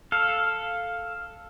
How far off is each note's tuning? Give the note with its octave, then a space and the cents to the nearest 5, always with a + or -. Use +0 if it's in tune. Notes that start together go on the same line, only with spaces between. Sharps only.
A4 +0 F5 +0